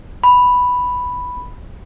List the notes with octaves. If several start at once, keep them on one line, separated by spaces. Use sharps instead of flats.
B5